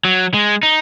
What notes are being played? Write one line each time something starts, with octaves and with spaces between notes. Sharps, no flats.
F#3
G#3
D#4